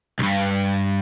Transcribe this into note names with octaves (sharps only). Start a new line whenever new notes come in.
B1 G2